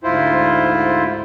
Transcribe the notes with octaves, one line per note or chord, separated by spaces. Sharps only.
D2 G#2 E4 F4 C5